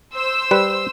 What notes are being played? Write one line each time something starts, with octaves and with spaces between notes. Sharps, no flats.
C5 E6
G3 B4